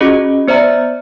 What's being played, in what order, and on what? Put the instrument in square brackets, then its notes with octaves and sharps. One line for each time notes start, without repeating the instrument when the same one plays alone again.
[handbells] C#4 F4 F#4 G#4 D#5
B3 C5 D5 E5 A#5